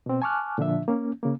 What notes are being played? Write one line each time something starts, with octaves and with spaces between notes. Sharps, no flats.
B2 C4
G#5 A5 C#6 D6 F6 F#6
A#2 D3 F3 D4 E5
A#3 C#4
C#3 A#3